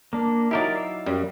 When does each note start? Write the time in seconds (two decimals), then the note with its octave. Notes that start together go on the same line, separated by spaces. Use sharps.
0.13 A#3 D4
0.51 F#3 D#4 E4 G4 A#4 D5
0.76 F5 E6
1.06 F#2 G3